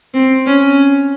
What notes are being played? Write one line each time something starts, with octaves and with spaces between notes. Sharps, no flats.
C4
C#4